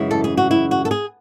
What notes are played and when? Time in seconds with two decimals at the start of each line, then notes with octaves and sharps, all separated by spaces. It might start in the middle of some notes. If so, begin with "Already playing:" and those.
Already playing: F#2 C#3 E3 G#3 E4
0.11 A4
0.24 G#4
0.37 F#4
0.51 E4
0.71 F#4
0.85 A4
0.91 G#4